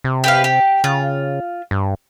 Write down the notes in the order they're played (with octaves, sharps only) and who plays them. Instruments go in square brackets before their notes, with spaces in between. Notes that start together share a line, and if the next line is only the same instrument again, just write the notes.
[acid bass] C3
[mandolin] G4 B4 F5
G4
[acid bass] C#3 [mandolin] F4
[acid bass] G2